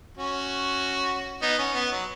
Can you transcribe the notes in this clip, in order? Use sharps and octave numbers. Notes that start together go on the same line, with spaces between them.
C#4 F#4
B3 D#4
C#4
B3
F#3